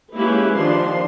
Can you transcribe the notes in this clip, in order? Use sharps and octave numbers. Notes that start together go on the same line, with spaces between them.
G#3 A#3 C#4 E4 G4 B4
D#3 F3 D4 D#4 C6